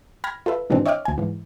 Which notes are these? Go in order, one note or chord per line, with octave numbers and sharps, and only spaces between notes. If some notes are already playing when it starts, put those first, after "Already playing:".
G5 B5 F6 G#6 A#6
F4 A4 B4 E5
G#2 B2 D#3 E3 C4 D4
C#5 D#5 E5 G5 D6 F6
D2 G#5
G#2 E3